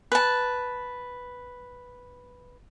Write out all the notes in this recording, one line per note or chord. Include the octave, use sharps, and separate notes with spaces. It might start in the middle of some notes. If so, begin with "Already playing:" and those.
B4 A5